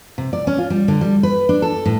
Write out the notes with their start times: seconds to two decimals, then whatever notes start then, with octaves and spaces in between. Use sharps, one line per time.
0.18 C3
0.33 D5
0.47 C#4
0.58 F4
0.70 G3
0.88 D3
1.01 G3
1.23 B4
1.49 D4
1.62 A4
1.86 A2